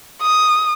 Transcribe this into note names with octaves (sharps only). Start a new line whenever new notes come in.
D#6